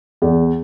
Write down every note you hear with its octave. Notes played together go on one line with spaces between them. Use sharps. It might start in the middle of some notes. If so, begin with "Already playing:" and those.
E2